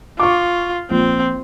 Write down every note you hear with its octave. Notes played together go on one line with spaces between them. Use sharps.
F4 C#6 D6
A#1 C4